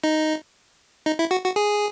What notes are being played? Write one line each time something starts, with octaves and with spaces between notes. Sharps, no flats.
D#4
D#4
E4
F#4
F#4
G#4